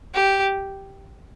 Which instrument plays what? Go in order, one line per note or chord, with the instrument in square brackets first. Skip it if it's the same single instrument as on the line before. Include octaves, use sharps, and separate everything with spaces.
[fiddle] G4